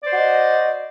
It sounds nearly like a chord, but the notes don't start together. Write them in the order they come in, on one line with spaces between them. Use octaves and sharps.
D5 C5 F#4 D#5